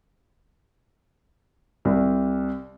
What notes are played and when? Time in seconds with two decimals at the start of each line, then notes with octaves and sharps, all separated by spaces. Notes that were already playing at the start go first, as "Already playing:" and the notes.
1.85 C2